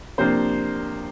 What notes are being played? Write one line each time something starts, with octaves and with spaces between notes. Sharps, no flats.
C3 F3 A#3 D4 C5